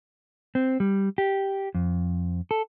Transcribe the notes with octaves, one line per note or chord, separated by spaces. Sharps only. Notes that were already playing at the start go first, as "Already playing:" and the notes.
C4
G3
G4
F2
A4